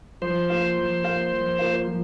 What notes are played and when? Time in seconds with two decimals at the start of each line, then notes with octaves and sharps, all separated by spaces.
0.22 F3 C5
0.50 A#3 F4 A#4 F5
0.78 F3
1.04 A#3 F4 A#4 F5
1.33 F3
1.59 A#3 F4 A#4 F5
1.87 F3